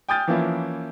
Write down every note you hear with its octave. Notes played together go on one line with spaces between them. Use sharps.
G5 G#5 D#6 F6 G6 A6
E3 F3 A#3 C#4 E4